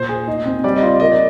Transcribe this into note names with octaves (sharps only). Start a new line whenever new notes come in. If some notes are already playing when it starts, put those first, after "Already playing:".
Already playing: A#2 C5
G#4
D#4
C4
G3 D5
D#5
F4 D5
A#3 D#5
D5